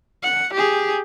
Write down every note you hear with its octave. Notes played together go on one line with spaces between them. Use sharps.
F#5
G4 G#4